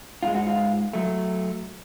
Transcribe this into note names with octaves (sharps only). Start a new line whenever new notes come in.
G#2 G#3 F4
F#4
F4
F#3 A3